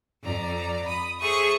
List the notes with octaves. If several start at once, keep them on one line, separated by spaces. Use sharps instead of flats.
F2 D5 A#5
B5 D#6
G#4 A4 C5 E5 C#6 D#6